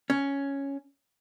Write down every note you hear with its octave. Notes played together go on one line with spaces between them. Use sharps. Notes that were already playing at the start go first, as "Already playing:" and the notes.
C#4